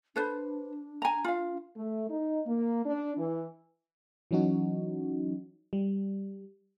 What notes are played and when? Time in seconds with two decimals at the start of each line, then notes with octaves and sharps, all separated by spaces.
0.16 D4 A4 B4 C5
1.02 G#5 A#5
1.24 F4 F5
1.77 A3
2.09 D#4
2.47 A#3
2.84 D4
3.18 E3
4.31 E3 F#3 C#4 D#4 F#4
5.73 G3